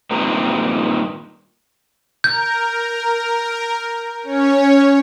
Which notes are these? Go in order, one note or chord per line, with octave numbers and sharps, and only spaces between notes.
G2 A#2 D#3 C4
A#4 G6
C#4 C#5